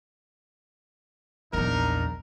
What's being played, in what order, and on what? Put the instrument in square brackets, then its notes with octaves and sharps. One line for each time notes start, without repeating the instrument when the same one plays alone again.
[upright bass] A#1 E2 [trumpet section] D4 D#4 A#4